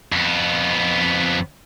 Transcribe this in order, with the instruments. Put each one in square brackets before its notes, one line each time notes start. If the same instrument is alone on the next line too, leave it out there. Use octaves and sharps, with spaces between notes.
[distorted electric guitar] F2 B3